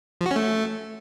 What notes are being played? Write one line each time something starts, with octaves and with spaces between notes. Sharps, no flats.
F3
F#4
C#4
A3